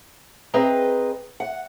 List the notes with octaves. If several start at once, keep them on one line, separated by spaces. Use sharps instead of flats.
C4 G#4 B4 D#5 A#5
F#5